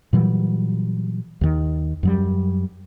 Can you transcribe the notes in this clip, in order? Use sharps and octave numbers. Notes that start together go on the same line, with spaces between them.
A#2 E3 F#3 G3
D#2 D#3
F#2 F#3 G3